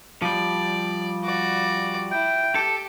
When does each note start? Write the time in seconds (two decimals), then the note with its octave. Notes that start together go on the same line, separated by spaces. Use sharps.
0.22 F3 G3 D5
1.24 F#4 D5
2.11 E4 G5
2.55 G4 A4